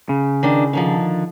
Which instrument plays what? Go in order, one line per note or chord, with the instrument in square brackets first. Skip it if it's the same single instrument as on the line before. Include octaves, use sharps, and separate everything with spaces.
[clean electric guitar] C#3
[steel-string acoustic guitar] D#3 D4
D3 D#3 F3